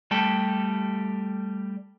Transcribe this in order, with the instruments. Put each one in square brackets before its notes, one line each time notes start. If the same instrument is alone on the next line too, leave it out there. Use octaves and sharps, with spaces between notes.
[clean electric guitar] G3 A3 G4 A4